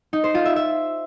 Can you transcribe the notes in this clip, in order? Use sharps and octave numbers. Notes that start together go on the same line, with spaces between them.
D#4
C5
F4
E5
E5